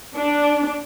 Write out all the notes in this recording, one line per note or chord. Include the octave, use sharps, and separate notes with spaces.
D4